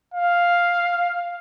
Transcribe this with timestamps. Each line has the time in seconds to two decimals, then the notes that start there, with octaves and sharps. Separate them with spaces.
0.14 F5